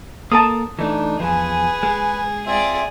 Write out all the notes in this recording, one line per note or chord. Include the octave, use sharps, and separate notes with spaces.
A#3 A4 A#4 A5 D#6
E3 A3 D4 D#4
E2 G#2 F3 G#4 B4 G#5
G#3
C4 F4 G#4 D5 E5